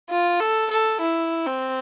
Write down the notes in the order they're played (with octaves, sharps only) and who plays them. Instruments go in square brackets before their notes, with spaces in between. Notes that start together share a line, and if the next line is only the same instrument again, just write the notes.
[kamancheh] F4
A4
A4
E4
C4